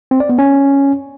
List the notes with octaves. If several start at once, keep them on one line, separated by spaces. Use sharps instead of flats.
C4
D5
B3
C#4